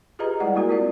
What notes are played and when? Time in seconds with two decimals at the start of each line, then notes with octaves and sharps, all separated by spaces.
0.19 F4 G4 G#4 B4 D#5 A#5
0.40 G3 G#3 E4 D5 F#5
0.55 G#3 A#3 E4 F#4 A#4
0.69 C4 F4 D5